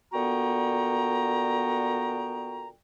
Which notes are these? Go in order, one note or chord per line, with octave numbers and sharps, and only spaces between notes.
A#2 D3 B3 F#4 G5 A#5